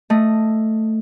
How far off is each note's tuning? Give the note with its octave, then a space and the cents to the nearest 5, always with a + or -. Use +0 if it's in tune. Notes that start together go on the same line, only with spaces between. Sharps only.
A3 +5 D#5 +0